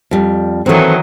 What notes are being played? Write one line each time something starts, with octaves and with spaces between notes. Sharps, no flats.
F2 G3
D#3 E3 F#3 C4 A4